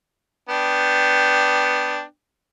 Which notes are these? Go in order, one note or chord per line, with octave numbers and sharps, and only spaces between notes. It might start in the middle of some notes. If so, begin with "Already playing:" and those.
B3 D4 G5